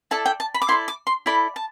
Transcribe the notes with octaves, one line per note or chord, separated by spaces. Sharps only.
E4 A4 D5 A5
G5
A5
B5
D6
E4 A4 D5 C6
D6
C6
E4 A4 D5 B5
A5